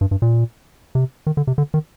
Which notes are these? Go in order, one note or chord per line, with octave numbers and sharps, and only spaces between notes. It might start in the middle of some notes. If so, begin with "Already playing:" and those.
G2
G2
A#2
C3
D#3
D3
C3
D3
D#3